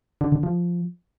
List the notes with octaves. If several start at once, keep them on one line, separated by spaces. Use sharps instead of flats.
D3
D3
F3